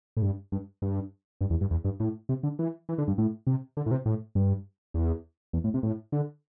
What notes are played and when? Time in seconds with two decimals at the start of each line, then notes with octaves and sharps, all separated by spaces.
0.17 A2
0.22 G2
0.52 G2
0.82 G2
1.41 G2
1.50 E2
1.61 G2
1.71 E2
1.84 G2
2.00 A2
2.29 C3
2.43 D3
2.59 E3
2.89 E3
2.98 D3
3.08 G2
3.18 A2
3.47 C3
3.77 D3
3.86 A2
3.91 C3
4.06 A2
4.35 G2
4.94 E2
5.53 E2
5.64 A2
5.74 C3
5.83 A2
6.12 D3